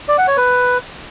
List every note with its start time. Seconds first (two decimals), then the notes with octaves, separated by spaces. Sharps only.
0.08 D5
0.18 F#5
0.28 C#5
0.37 B4